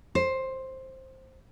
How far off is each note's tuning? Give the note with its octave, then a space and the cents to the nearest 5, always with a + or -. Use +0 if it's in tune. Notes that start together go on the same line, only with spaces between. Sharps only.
C5 +10